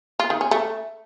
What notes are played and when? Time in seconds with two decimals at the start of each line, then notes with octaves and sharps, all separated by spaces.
0.20 F4
0.30 D#3
0.41 C#4
0.51 A3